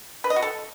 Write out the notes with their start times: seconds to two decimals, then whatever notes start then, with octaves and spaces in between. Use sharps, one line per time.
0.24 B4
0.30 D#5
0.36 F#4
0.42 A4